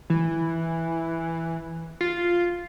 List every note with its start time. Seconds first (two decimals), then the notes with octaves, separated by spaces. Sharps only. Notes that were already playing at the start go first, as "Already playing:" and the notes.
0.10 E3
2.01 F4